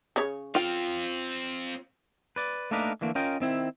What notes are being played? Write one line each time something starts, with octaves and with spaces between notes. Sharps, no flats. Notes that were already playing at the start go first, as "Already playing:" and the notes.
C#3 C#5
C4 F4 F5 G5
B4 D5
A3 A#3 D4 D#4 A#4 B4
D3 E3 A3 A#3
C#4 F4 A#4 D#5 G5
D#3 C4 E4